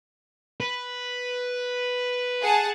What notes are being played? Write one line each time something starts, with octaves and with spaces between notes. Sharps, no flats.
B4
G#4 F#5 A5